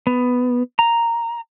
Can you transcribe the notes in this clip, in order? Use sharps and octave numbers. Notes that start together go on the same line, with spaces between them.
B3
A#5